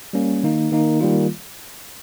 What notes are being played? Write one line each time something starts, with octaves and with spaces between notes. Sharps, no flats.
G3 A#3 C#4
D#3 A#3 D#4
D#3 A#3 D#4
D#3 G3 A#3 F4